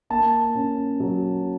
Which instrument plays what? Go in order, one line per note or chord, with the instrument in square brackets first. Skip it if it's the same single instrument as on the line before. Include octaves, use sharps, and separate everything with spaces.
[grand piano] A#3 A5
C#4
F#3